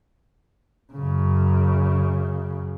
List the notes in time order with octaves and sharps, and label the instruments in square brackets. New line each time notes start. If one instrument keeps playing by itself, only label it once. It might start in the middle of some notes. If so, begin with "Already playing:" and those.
[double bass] F#2 C#3